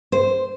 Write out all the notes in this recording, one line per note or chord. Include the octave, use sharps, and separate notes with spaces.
C5